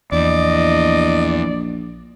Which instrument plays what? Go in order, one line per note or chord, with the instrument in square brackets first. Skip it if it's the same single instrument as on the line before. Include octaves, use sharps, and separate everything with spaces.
[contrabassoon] A#1 [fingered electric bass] E2 [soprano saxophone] D5 [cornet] D#5